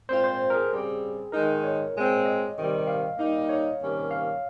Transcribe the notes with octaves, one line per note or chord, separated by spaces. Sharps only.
A#2 G#3 C4 F4 C5
C5
A#4
G#4
C#3 G3 C4
D#3 G#3 D#4 A#4
C#5
A#2 G#3 C4
D#5
C3 D#3 G3
F5
G3 A#3 D#4
C#5
C3 D#3 G3 A#3 C#4
F5